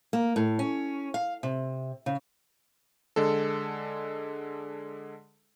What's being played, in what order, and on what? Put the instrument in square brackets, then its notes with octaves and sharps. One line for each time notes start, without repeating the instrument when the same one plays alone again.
[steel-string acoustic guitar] A#3
A2
C#4
F5
C3
C#3
[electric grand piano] D3 G#3 A4